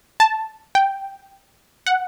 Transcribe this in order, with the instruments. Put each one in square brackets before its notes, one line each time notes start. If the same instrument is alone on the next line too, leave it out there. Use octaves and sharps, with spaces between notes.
[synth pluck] A5
G5
F#5